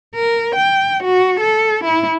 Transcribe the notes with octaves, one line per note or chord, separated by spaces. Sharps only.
A#4
G5
F#4
A4
E4